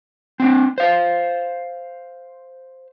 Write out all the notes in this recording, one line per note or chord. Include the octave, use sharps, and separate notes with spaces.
C4 D4
C5 F5